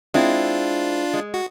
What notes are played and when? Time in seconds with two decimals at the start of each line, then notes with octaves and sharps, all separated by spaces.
0.14 G#3 C4 D4 E4 F4
1.13 G#3
1.34 F#4